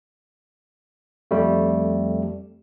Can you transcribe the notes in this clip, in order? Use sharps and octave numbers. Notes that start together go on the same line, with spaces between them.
F2 G3 A3